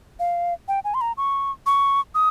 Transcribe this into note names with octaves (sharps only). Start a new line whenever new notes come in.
F5
G5
G#5
C6
A#5
C#6
C#6
D#6